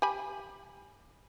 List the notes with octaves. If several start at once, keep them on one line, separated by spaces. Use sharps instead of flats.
G4 G#5 B5